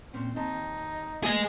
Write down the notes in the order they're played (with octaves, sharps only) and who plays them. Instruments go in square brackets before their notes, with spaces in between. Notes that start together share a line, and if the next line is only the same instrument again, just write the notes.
[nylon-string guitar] A#2 C4 C#4
[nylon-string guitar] D#2 C4 A5 [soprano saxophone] D#4
[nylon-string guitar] E3 A3 A#3 [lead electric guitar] G#4 D#5